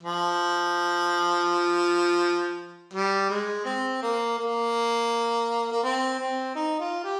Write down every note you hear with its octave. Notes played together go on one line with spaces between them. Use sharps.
F3
G3
G#3
C4
A#3
A#3
A#3
C4
C4
D#4
F4
G4